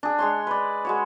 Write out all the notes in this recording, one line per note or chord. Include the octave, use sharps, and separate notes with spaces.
D4 G#4
G#3 C#5 C6
B4 D5
G#3 F#4 C#5